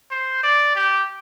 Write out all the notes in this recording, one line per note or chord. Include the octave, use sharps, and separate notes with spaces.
C5
D5
G4